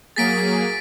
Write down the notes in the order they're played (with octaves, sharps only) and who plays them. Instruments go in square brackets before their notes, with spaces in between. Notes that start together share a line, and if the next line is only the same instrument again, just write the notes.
[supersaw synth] F#3 A#3 G#4 [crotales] A6 B6 D7